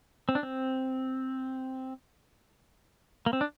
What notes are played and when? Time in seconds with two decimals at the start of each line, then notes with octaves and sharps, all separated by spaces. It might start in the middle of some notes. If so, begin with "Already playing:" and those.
0.29 C4
0.35 D4
0.43 C4
3.26 A#3
3.33 C4
3.41 D4